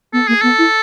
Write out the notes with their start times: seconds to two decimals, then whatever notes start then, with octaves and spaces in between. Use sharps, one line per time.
0.13 B3 A4
0.28 A#3 G#4
0.41 B3 A4
0.59 E4